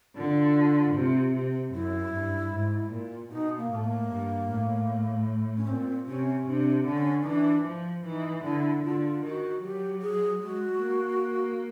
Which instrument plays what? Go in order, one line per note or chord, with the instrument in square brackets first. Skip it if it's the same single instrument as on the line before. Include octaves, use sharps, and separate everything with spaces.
[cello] D3 [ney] F4
[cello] C3
C3
[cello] F#2 [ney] E4
[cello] G2
G#2
A#2
[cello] B2 [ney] D#4
[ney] A#3
[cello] A2 [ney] A3
[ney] A#3
[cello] G2
A2
[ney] C#4
[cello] A#2 [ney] C4
[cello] C3 [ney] C#4
[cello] C3 [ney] D4
[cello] D3 [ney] C#4
[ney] D#4
[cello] E3 [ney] D4
[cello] F3
[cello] E3 [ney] D#4
[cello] D3 [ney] E4
[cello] D3 [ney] F4
[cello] D#3 [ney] F#4
[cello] F#3 [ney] G4
[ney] G#4
[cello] G#3 [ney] F#4
[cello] A#3